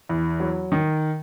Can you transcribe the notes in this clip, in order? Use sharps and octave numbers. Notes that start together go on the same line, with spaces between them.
E2
F#3
D#3